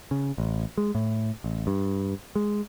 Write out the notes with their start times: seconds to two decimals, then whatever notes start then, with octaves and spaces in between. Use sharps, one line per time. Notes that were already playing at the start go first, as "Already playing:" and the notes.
0.11 C#3
0.38 A1
0.78 G#3
0.95 A2
1.44 A1
1.67 G2
2.35 G#3